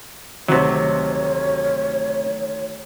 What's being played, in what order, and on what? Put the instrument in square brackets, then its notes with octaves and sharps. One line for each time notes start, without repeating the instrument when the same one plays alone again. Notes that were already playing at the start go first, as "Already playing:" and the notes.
[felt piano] D2 D#3 [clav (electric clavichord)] C3 F#3 [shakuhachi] C#5